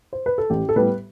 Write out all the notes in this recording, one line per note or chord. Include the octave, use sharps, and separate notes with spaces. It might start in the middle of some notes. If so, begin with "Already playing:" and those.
C5
B4
A4
A1 G4
A4
A2 G3 B3 B4